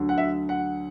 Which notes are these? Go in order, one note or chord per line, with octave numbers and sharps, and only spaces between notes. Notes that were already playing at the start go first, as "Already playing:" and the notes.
Already playing: D2 D3 F#3
F#5
E5
F#5